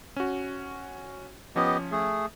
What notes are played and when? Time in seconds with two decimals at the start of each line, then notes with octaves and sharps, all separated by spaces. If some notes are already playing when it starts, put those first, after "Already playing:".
0.16 C#4 F#4
1.56 F3 B3 C#4 G4 D#5
1.91 A3 G#4